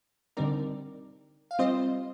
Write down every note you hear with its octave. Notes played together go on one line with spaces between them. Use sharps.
D3 G3 C4 D#4 A#4 D5
F5
G3 C4 F4 C5 D#5